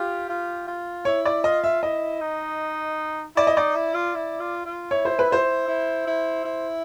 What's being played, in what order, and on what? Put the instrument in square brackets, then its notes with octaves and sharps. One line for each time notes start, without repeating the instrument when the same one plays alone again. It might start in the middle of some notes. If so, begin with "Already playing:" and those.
Already playing: [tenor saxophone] F4 [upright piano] G4
[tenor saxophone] F4
F4
[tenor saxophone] E4 [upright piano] C#5
[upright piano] D5
[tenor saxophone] F4 [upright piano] D#5
[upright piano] E5
[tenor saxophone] E4 [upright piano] D#5
[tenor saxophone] D#4
[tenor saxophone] E4 [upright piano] D5
[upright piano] D#5
[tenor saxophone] D#4 [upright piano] D5
[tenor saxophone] E4
F4
E4
F4
F4
[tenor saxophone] E4 [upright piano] C#5
[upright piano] C5
B4
[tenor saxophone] E4 [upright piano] C5
[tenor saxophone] E4
E4
E4